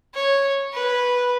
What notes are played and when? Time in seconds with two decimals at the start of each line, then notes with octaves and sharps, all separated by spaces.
0.14 C#5
0.73 B4